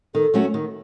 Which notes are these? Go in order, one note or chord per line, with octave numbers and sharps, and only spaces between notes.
D#3 A4
F#3 A3 C#4 F#4
D#3